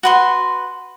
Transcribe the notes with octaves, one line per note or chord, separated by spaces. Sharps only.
F#4 B4 C6